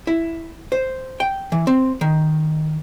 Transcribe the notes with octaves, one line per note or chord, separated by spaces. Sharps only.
E4
C5
G5
E3
C4
D#3